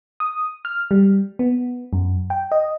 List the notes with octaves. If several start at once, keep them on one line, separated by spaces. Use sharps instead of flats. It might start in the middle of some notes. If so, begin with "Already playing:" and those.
D#6
F6
G3
B3
F#2
G5
D#5